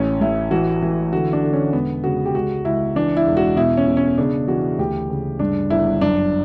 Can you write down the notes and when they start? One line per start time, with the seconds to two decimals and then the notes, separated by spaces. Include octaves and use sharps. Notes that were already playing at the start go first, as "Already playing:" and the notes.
Already playing: A1 C#4
0.21 A1 E4
0.51 E3 F#4
0.82 E3
1.13 D3 F#4
1.33 D4
1.44 D3
1.53 C#4
1.73 E1 B3
2.04 C#3 F#4
2.26 G4
2.34 C#2 F#4
2.65 C#2 E4
2.96 E3 D4
3.17 E4
3.27 E1
3.37 F#4
3.56 B2 E4
3.77 C#4
3.87 B2
3.97 C#4
4.18 C#3 D4
4.48 E3 F#4
4.79 D2 G4
5.10 C#3
5.39 G2 D4
5.70 G1 E4
6.01 F#2 D4